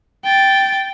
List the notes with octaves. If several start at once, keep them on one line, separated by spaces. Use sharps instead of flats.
G5 A6